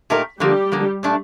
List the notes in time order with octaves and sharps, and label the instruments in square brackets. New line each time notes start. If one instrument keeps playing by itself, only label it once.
[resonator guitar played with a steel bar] A#2 A3 D#4 G4 A#4
[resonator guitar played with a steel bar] D3 F3 A#3 [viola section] G3 G4
[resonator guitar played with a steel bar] D3 F3 A#3
A#2 A3 D4